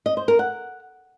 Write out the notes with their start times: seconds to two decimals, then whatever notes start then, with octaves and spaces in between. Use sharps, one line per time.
0.06 D#5
0.17 C5
0.28 A#4
0.39 F#5